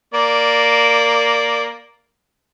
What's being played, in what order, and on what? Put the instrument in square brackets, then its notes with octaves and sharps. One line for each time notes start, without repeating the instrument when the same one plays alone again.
[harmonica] A#3 D5